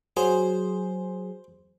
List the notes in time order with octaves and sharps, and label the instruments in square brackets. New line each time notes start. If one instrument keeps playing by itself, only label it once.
[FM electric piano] F#3 G#4 [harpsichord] C5